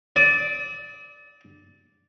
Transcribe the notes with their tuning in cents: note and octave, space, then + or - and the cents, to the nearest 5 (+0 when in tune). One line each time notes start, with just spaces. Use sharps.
D5 -5 D#6 +45